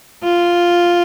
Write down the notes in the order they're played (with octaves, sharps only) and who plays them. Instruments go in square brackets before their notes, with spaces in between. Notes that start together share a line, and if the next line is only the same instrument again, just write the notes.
[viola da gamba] F4